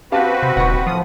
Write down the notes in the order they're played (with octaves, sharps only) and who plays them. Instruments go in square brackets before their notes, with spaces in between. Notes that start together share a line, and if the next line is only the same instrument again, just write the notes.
[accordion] C4 F#4 B4 [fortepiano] G4 F5 A5
[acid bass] C3
[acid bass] D#1 [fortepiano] F#5 C#6
[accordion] A2 D#6 [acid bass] F3